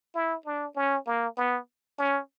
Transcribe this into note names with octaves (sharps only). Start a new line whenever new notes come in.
E4
D4
C#4
A#3
B3
C#4